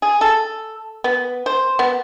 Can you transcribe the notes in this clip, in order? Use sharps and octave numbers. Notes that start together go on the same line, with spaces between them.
G#4
A4
B3
C5
B3